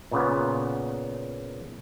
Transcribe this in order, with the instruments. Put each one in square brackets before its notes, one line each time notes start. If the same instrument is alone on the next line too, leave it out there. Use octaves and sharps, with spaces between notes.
[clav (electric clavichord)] A#2 C#3 B3